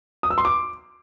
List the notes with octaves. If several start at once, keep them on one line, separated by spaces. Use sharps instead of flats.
D#6
E6
C6
D6